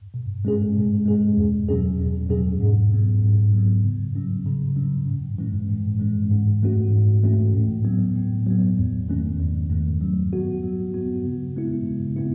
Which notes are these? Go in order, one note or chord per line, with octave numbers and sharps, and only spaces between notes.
B2
G#3 C#4 G#4
B2
G#3 C#4 G#4
E2
B2 F#3 C#4 G#4
E2
B2 F#3 C#4 G#4
G#2
F#3 B3
G#2
F#3 B3
C#3
F#3 C#4
C#3
F#3 C#4
A2
E3 G#3 C#4
A2
E3 G#3 C#4
G#2
E3 A3 C#4 F#4
G#2
E3 A3 C#4 F#4
A2
F#3 B3
A2
F#3 B3
E2
D#3 A3 C#4
E2
D#3 A3 C#4
F#3
B3 F#4
F#3
B3 F#4
C#3
G#3 B3 E4
C#3
B3 E4